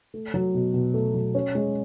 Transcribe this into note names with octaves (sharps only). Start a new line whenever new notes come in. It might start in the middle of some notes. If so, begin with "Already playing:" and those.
A3
F#3
B2
B2
A3
F#3
C#4
G#3